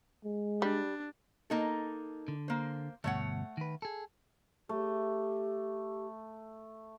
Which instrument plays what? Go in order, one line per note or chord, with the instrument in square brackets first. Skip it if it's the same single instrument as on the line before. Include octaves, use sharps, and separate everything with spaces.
[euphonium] G#3
[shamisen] G3 [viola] D4
[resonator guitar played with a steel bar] A#3 D#4 A4
[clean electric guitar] D3
[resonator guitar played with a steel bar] A#3 C5
[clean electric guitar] D2 G2 B2 [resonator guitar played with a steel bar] A3 C#5 F#5
[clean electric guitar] D#3 B4
G#4 A4
[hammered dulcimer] A3 [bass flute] G4